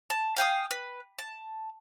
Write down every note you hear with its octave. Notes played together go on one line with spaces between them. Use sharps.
A5
F5 G5 G#5 D#6
B4
A5